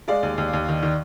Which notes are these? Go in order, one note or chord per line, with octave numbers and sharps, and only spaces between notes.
G#3 D5 F5
D#2
D#2
D#2
D#3
D#3